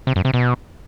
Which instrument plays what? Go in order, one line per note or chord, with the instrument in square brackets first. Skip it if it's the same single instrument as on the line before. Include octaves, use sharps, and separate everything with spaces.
[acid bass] C3
F#2
C3
B2